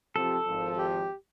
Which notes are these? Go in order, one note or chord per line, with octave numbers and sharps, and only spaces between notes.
C3 F3 G4 A4
G#1 F3
G4